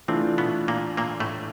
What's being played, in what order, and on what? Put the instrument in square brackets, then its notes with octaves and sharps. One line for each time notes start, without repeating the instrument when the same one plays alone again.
[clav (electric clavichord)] C3 C4 [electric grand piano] E3 A3 D4 F4
[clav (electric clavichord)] B2 B3
A#2 A#3
A#2 A#3
A2 A3